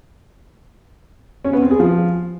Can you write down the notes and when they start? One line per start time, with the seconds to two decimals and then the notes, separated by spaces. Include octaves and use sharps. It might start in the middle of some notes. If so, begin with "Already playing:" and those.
1.45 C#4
1.53 B3
1.62 C4
1.71 G#4
1.80 F3